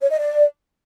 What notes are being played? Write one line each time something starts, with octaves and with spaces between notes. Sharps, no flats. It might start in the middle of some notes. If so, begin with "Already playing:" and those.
C#5
D#5
D5